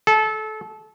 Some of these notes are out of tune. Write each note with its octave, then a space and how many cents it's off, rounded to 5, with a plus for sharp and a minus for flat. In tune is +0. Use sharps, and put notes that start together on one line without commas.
A4 -25